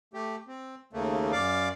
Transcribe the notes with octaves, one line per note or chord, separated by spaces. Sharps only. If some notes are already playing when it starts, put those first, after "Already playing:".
A3 G4
C4
D#2 C#3 A3 A#3
F#2 D5 F5 D6